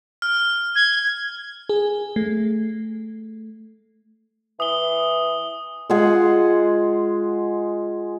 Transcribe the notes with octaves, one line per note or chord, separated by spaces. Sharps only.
F6
G#6
G#4
A3
E3 D#6 G7
G#3 F4 G#4 F#5